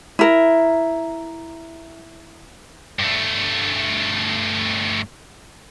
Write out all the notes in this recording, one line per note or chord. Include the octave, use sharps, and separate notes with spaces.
E4 A#4
G2 A3